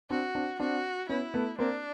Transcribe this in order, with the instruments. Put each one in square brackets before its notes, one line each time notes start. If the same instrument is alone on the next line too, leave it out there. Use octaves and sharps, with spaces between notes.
[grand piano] C4 D4 [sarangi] F#4
[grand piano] C4 D4
[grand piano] C4 D4 [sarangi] F#4
[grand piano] B3 C#4 [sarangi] E4
[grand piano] A3 B3
[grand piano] A#3 C4 [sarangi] D4